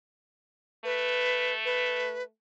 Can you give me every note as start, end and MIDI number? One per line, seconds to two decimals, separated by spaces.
0.85 2.29 57
0.85 1.53 71
1.65 2.23 71